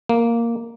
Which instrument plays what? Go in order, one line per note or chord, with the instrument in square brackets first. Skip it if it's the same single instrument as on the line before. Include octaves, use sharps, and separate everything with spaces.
[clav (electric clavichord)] A#3